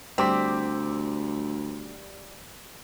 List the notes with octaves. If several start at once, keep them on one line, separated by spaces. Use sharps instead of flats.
D2 G3 C4 D6 B6